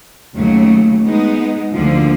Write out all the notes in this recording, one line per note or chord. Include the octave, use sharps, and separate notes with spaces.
D#2 C#3 F#3 A3
G#3 B3 D#4
D2 D3 F3 A#3